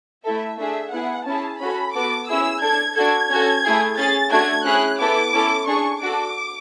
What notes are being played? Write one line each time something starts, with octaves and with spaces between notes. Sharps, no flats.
A3 E4 A4 E5
A3 D4 G#4 E5
B3 E4 G#4 F#5
C#4 E4 G#4 A5
C#4 F#4 A4 B5
B3 F#4 A4 D6
C#4 E4 G#4 E6
D4 A4 G#6
D4 F#4 A4 G#6
C#4 F#4 A4
A3 E4 G#4
C#4 G#4 A6
A3 D4 F#4 G#6
C#4 E4 G#4 F#6
B3 E4 A4 D6
C#4 E4 A4
D4 G#4 C#6
D4 F#4 A4 D6